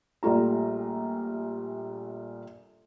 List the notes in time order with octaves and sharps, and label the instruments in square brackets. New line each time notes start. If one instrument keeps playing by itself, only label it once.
[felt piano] A#1 G3 A3 F4 A#5